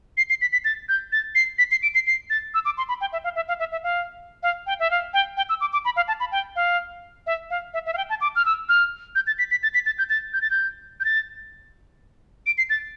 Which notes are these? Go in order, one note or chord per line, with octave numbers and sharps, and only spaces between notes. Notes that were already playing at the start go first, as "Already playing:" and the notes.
C7
C7
B6
B6
A6
G6
A6
C7
B6
C7
D7
C7
C7
A6
E6
D6
C6
B5
G5
E5
F5
E5
F5
E5
E5
F5
F5
G5
E5
F5
G5
G5
E6
D6
D6
B5
F5
A5
B5
G5
F5
E5
F5
E5
E5
F5
G5
A5
D6
F6
E6
F6
G6
A6
B6
B6
A6
B6
A6
G6
A6
G6
A6
G6
G6
A6
D7
C7
A6